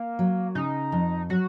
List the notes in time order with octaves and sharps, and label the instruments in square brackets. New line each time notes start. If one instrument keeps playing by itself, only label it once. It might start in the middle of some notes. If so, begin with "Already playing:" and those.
Already playing: [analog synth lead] A#3
[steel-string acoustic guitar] F#3
[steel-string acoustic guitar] C#3 [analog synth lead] D#4
[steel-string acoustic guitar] F2
[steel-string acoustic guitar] F#3 [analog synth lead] F#4